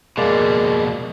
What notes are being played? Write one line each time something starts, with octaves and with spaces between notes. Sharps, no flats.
F2 B2 G#3 A#3 D5